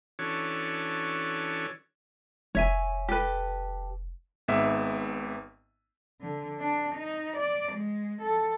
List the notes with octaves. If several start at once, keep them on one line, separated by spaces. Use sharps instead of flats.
E3 C#4 D4 F#4 A4 C#5
F1 C#5 E5 G#5
G4 A4 B4
G#1 G#2 B3 E5
D3
D4
D#4
D5
G#3
A4